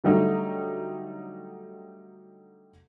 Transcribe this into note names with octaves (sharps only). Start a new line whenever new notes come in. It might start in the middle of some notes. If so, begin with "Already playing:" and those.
D3 F#3 G3 A3 D#4